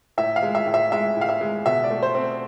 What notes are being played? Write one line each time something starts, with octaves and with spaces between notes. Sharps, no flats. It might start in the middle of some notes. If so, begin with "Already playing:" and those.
A2 E5
F5
G#3
E5
A2
E5
G#3 E5
A2 F5
E5
G#3
B2 E5
D5
A3
C5
C4